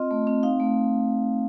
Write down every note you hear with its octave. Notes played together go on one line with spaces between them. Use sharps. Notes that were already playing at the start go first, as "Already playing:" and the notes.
Already playing: C4 F4 D#5
A3
C4
D#4 F5
A3